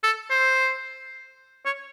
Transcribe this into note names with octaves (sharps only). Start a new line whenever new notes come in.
A4
C5
C#5